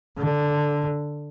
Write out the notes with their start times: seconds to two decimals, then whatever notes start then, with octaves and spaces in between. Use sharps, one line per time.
0.18 D3